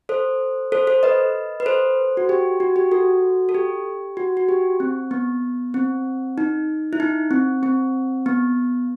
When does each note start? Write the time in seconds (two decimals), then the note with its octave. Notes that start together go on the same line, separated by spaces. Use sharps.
0.09 A4 C5
0.72 A4 C5
0.87 A4 C5
1.03 B4 D#5
1.60 B4
1.66 A4 C5
2.17 F#4
2.29 G4
2.60 F#4
2.76 G4
2.91 F#4 A4
3.49 A4
3.54 G4
4.17 F#4
4.37 F#4
4.49 G4
4.80 C4
5.11 B3
5.74 C4
6.38 D#4
6.93 E4
7.00 D#4
7.31 C4
7.63 C4
8.26 B3